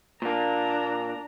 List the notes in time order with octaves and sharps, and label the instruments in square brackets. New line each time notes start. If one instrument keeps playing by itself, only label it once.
[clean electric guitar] A#2 A#3 [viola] D4 A#5